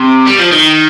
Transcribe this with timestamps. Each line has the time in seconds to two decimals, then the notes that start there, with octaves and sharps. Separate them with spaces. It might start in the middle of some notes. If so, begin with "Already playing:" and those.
Already playing: C3
0.27 G3
0.39 F3
0.52 D#3